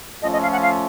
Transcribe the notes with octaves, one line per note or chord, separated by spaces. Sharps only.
F3 A3 C#4 F4 A4 D#5
D#5
F5
F#5
F5